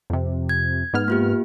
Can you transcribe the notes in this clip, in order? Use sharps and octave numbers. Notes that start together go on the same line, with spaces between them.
F2 C3
G#6
G#2 B3 F6
A#3 F4 G4